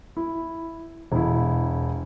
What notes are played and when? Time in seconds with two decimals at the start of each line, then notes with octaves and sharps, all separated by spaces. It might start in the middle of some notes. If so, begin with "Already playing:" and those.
0.17 E4
1.12 E1 E4